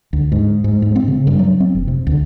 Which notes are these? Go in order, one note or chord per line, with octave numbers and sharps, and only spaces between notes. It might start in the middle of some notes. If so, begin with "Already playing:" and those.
D2
G#2
G#2
G#2
C4
C#3
G2
F#3
C4
F1
C3
D2